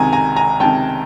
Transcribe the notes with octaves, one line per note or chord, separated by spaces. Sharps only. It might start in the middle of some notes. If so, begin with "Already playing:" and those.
Already playing: C#2 C3 D#3 G#5 A#5
G#5 A#5
G#5 A#5
C#2 C3 D#3 G5 A5